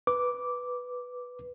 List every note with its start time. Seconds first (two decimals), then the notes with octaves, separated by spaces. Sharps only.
0.07 B4 D6